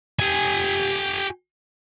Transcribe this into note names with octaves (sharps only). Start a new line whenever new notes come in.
G4 G#5